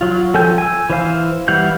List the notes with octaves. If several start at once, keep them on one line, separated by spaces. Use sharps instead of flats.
F#3 F4
F3 A4 G5 G#5 G6
G#5 E6
E3 C5 F5
E3 G3 F5 F#5 G6